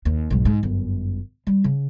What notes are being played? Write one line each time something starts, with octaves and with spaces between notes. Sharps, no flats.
D#2
B1 G#2
G#2
G1 F#2
G3
C#3